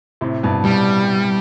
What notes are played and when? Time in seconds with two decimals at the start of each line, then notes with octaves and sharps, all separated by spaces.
0.21 A2 C3
0.43 G2 B2
0.64 G2 B2 G3